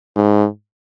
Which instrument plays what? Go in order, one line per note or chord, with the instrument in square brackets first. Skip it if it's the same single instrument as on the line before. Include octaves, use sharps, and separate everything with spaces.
[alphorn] G#2